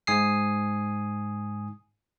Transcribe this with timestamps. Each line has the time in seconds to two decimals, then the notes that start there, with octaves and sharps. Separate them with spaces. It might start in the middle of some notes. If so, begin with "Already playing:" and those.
0.07 G#2 G#5 D#6 C7